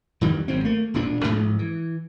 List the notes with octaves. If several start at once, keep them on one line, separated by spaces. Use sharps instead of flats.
F2 D#3 E3 G3
G#1 G2 F#3 C4
A3 A#3
E1 D2 A#2 D4
A1 G#2 C3 F3
E3